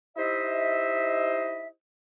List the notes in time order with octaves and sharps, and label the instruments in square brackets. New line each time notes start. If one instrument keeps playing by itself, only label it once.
[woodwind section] D#4 E4 G4 C5 D#5 E5